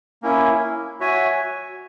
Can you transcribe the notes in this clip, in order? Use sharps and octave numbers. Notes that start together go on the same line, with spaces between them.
A#3 C#4 E4
F#4 C#5 E5 G#5